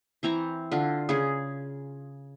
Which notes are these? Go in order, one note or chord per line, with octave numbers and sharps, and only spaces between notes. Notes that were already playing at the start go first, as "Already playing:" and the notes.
E3 C4 A#5 C#6
D3 F4
C#3 G#4